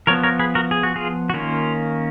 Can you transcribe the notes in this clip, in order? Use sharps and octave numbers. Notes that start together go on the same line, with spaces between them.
F3 B3 A#4 C#5
A#4 C#5
G#4 B4
F#4 A#4
G#4
F#4
F4 G#4
F#4
D#3 A#3 C#4 F4